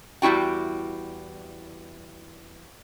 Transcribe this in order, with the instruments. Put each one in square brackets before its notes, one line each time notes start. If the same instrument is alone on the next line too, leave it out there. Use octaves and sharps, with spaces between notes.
[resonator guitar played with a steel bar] E2 G3 E4 F#4 G5